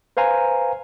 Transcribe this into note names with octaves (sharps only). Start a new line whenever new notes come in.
B4 C5 F5 G#5 A#5